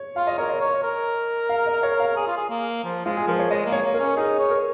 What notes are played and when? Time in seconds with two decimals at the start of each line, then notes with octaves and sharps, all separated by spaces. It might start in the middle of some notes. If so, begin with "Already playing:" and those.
Already playing: C#5
0.16 F4 F5
0.27 D#5
0.38 A#4 C#5
0.49 D#5
0.61 C#5
0.83 A#4
1.49 F5
1.66 D#5
1.83 C#5
2.00 F5
2.17 G#4
2.27 F4
2.37 G#4
2.49 A#3
2.84 F3
3.05 G#3 F4
3.17 G#4
3.27 F3 A#4
3.39 C#5
3.50 G#3 D#5
3.66 A#3
3.72 C#5
3.83 A#3
3.94 A#4
3.99 C#4
4.16 D#4 G#4
4.39 C#5
4.50 A#4